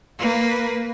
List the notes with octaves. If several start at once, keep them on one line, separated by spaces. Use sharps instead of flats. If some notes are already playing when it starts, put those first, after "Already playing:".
A#3 B4